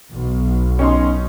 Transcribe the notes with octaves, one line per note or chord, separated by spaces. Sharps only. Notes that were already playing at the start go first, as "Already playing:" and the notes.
B1
C#4 D#4 C6